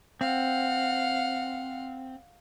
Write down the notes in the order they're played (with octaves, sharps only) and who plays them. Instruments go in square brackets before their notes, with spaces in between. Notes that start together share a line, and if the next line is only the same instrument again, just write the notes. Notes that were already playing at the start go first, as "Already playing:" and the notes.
[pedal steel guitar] C4 [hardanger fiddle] F5 F#5